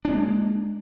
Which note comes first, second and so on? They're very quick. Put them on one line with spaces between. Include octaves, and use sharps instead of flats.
D4 C#4 G#3 A#3